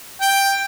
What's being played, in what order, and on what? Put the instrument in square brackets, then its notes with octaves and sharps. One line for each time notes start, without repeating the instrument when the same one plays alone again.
[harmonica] G5